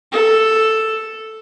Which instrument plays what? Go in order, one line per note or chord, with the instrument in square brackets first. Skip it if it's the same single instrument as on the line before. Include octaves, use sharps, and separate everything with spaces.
[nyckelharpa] A4